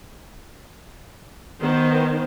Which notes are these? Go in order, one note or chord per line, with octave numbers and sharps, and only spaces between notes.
D#3 B3 C5